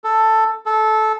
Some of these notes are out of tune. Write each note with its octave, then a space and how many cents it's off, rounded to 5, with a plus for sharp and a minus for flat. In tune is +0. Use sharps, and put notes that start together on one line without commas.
A4 +5
A4 -15